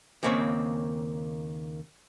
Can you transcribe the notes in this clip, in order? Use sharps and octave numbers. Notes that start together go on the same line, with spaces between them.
D#2 C#3 A#3 C4 C#5